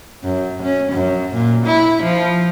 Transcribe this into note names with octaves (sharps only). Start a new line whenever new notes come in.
F#2
C#4
F#2
A#2
E4
F3